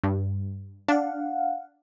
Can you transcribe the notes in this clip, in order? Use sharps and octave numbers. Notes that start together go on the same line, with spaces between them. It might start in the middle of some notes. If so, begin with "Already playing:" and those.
G2
D4 F5 F#5